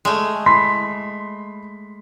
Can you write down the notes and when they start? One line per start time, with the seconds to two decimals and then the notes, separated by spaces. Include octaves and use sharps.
0.05 G#3 A3
0.46 B5 C6 B6